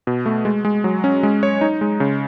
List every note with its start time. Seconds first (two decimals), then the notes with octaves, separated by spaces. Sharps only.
0.07 B2
0.26 A3
0.45 G#3
0.65 G#3
0.84 F#3
1.04 C#4
1.23 G#3
1.43 C#5
1.61 D#4
1.81 G#3
2.00 C#3